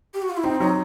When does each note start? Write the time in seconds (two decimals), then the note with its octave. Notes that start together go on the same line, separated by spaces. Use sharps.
0.14 G4
0.22 F#4
0.30 F4
0.37 E4
0.44 C4 D#4
0.60 F#3 D#4